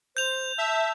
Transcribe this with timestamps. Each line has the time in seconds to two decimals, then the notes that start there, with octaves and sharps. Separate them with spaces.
0.17 C5 G6 F7
0.58 E5 A5